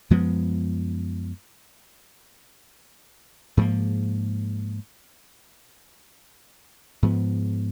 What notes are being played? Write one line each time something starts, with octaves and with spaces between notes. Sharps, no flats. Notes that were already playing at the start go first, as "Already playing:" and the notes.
F#2 F3 G#3 B3
G#2 F3 A#3
G#2 F3 B3